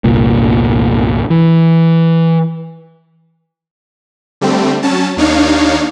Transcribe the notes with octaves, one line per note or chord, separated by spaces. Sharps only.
G1 C2 A#2
E3
D3 G3 A3 C4
F#3 C#4 A5
D#2 D4 D#4 C#5 F5